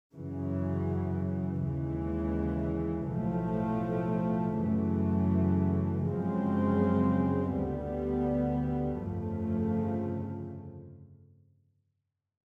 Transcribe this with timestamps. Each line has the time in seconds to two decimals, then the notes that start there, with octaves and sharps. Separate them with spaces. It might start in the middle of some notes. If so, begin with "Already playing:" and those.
0.14 F#2 C#3 E3
1.61 D#2 C#3 E3 G#3
3.09 B1 A2 F3 A3
4.56 F#2 C#3 E3 A3
6.03 F#2 C#3 F3 G#3 C4
7.51 D2 D3 G3 B3
8.99 G1 F2 C#3 F3 A3